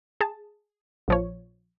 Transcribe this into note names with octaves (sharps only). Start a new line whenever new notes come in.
G#4 A5
A#1 F3 C#5